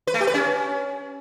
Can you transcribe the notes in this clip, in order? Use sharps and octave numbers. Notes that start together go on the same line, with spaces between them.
B4
A3
G4
B4
C#4